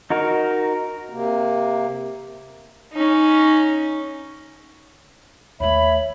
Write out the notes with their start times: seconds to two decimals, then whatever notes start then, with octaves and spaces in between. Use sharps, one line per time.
0.10 D#4 F#4 A#4
1.09 C3 A#3
2.93 C#4 D#4
5.60 D#2 A3 C#5 E5 B5